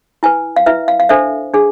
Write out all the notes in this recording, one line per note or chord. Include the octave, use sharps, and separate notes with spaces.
E4 B4 G#5
F5
E4 B4 E5
F5
F5
D4 A4 C5 E5
D4 G#4